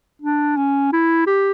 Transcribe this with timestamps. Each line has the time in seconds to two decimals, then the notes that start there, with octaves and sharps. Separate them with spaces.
0.22 D4
0.57 C#4
0.92 E4
1.27 G4